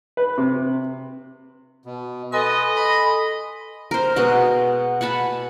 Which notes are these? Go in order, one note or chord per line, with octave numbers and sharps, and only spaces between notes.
B4
C3
B2
A4 B4 D#5 G#5 C6
B5
A#4 C5
B2 G#3 F#4 D#5
F#5 G#5 A5 B5